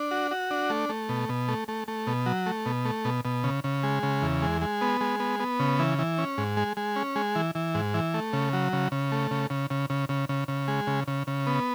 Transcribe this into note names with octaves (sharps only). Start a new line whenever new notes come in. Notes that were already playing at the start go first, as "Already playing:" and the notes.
Already playing: D4
F#4
F#4
D4
A3
A3
B2
B2
A3
A3
A3
B2
F#3
A3
B2
A3
B2
B2
C#3
C#3
G#3
C#3
E2
G#3
G#3
B3
G#3
B3
B3
C#3
E3
E3
C#4
G#2
G#3
G#3
C#4
G#3
E3
E3
G#2
E3
A3
C#3
F#3
C#3
C#3
A3
C#3
C#3
C#3
C#3
C#3
C#3
C#3
G#3
C#3
C#3
C#3
B3